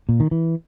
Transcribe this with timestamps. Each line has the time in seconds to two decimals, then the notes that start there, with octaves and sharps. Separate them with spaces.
0.09 A#2
0.20 D#3
0.31 E3